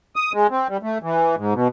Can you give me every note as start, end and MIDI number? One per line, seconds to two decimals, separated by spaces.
0.16 0.32 87
0.33 0.47 56
0.50 0.68 60
0.69 0.77 55
0.83 0.98 57
1.02 1.35 52
1.37 1.54 44
1.54 1.68 47